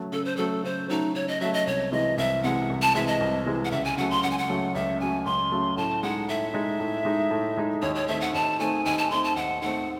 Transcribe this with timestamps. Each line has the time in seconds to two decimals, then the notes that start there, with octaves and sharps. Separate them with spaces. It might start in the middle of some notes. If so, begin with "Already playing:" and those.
Already playing: C#3 F#3 A3
0.12 C#3 A4
0.25 C5
0.37 F#3 A3 A4
0.64 C#3 C5
0.90 F#3 A3 D#4
1.15 C#3 C#5
1.28 D#5
1.41 F#3 A3 E5
1.53 D#5
1.67 C2 C#5
1.92 C3 E3 G#3 D#5
2.18 C2 E5
2.43 C3 E3 G#3 F#5
2.70 C2
2.82 A5
2.95 C3 E3 G#3 E5
3.07 D#5
3.20 C2
3.46 C3 E3 G#3
3.65 F#5
3.71 C#2 E5
3.85 G#5
3.97 C#3 F#3 A3 F#5
4.11 C6
4.23 C#2 F#5
4.31 G#5
4.38 F#5
4.49 C#3 F#3 A3
4.75 C#2 E5
5.00 C#3 F#3 A3 G#5
5.25 C#2 C6
5.52 C#3 F#3 A3
5.77 A2 A5
6.03 G#3 D#4 F#5
6.28 A2 E5
6.54 G#3 D#4
6.80 A2
7.05 G#3 D#4
7.31 A2
7.57 G#3 D#4
7.82 D#2 C#5
7.95 C#5
8.08 D#3 A3 C4 E5
8.21 F#5
8.33 D#2 A5
8.59 D#3 A3 C4 G#5
8.85 D#2 G#5
8.98 A5
9.10 D#3 A3 C4 C6
9.24 A5
9.36 D#2 F#5
9.62 D#3 A3 C4 F#5